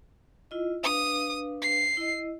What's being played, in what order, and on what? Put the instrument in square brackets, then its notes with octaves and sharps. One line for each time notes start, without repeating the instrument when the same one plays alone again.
[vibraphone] E4 F4 D#5
[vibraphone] D4 B4 F5 [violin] D#6
[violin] C7
[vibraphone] E4 D#5